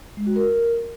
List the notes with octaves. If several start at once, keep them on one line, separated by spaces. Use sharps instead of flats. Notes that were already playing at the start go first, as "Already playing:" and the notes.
G#3
F#4
A#4